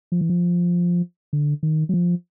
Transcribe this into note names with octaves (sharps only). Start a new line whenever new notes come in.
F3
E3
F3
D3
D#3
F#3
F3